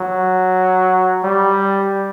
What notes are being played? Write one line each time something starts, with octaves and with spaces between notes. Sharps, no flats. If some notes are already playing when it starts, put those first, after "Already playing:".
Already playing: F#3
G3